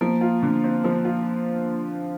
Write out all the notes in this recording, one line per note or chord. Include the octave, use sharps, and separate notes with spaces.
F3 A#3
F4
D3
C4
F3
F4